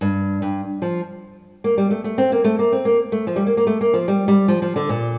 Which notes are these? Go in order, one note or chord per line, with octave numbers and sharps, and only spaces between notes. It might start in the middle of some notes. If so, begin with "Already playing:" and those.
G2
G2
F3
A#3
G3
A3
A3
C4
A#3
A3
A#3
C4
A#3
A3
F3
G3
A#3
A#3
A3
A#3
F3
G3
G3
F3
F3
D3
A#2